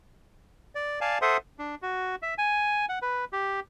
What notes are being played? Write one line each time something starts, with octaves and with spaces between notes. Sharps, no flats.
D5
D5 F5 G#5 A5
A4 C5 E5 F#5 C6 D#6
D4
F#4
E5
G#5
F#5
B4
G4